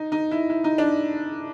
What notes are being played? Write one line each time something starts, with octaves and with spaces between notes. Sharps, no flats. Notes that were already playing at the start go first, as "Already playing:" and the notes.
Already playing: D#4
D#4
E4
E4
D#4
D4